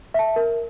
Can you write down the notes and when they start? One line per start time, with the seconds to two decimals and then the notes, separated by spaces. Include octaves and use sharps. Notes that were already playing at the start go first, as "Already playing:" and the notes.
0.14 E5 A5
0.36 A#4